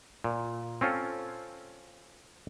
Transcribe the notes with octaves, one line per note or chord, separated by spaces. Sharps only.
A#2
C4 C#4 F4 A4